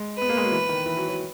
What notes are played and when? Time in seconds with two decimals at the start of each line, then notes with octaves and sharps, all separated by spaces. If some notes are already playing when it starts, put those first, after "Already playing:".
Already playing: G#3
0.18 B3 B4
0.29 A#3
0.37 G#3
0.44 F#3
0.52 E3
0.69 D#3
0.85 E3
0.97 F#3
1.08 F#3